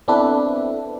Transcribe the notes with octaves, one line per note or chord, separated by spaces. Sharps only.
B3 C4 D4 E4 A4 B4